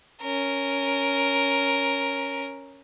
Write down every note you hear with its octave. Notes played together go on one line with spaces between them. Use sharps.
C#4 A#4